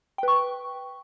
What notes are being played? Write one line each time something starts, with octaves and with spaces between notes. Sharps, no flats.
B4 G5 C#6